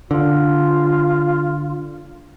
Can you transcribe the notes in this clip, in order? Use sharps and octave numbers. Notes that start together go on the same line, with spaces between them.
D3 F4